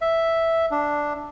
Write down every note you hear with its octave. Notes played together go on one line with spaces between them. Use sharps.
E5
D4